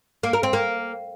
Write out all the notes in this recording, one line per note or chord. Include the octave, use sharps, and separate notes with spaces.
A#3
A#4
C4
A#3